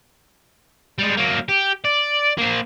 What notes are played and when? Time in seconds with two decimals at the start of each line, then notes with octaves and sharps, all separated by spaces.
0.98 G3 G#3
1.17 F#3 A#3
1.48 G4
1.84 D5
2.38 A#3 C5